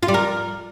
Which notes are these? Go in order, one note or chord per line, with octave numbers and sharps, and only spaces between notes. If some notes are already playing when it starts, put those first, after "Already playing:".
F4
G3
A#4